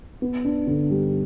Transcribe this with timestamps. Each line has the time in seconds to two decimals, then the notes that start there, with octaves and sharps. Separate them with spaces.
0.22 B3
0.45 D4
0.67 D3
0.91 G3